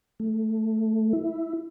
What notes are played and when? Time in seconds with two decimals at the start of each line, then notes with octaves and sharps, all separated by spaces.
0.20 A3
1.13 E4